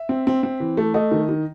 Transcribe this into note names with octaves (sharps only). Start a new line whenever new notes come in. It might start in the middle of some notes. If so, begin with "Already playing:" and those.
Already playing: E5
C4
C4
C4
E3
A3
A3 D#5
D#3
D#3